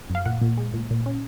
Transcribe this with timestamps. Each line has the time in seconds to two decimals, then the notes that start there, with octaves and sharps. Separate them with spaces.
0.10 F#2
0.15 F5
0.26 A#2 F#5
0.41 A#2
0.58 G#3
0.74 A#2
0.90 A#2
1.06 C#4